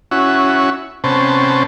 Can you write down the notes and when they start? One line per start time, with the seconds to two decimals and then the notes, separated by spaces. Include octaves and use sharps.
0.11 C#4 E4 F#4
1.04 C3 B3 C#4 C5 A5